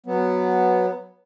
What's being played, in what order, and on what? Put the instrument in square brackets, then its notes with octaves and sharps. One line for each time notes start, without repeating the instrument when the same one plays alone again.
[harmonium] F#3 B3